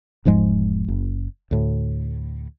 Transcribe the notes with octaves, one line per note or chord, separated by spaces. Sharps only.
E1 G#2 F3 G#3
F#1
D2 A2